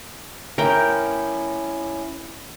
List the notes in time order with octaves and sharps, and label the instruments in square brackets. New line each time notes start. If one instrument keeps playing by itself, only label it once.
[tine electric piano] C#4 E4 [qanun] A#4 G5